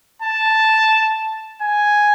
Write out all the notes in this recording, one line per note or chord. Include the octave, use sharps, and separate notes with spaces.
A5
G#5